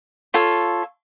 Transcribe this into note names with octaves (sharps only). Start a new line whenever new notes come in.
F4 A4 C#5